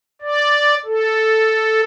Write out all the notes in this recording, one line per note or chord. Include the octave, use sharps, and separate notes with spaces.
D5
A4